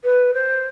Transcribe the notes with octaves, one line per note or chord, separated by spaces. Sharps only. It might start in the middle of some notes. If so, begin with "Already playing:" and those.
B4
C5